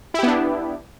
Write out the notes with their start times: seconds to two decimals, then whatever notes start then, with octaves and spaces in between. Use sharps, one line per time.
0.14 E4
0.19 G4
0.23 B3
0.28 D4